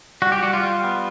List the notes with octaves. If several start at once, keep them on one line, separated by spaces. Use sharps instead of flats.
G3 F#4
G4
G3 F#4
F4
G3
B3